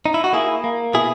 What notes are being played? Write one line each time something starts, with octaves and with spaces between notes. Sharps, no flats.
D#4
E4
F#4
A#3 E4 G#4
A#3
B2 E4 G#4